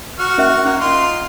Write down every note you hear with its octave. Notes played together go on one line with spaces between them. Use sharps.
F#4 C#6 F6
C#4 A#4 E5
A#3 C#4
D#4 F4 C6